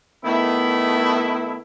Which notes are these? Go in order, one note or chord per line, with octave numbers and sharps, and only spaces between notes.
D#3 A3 B3 E4